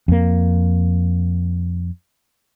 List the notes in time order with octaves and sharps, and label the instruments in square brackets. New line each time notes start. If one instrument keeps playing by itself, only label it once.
[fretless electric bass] F2 A#3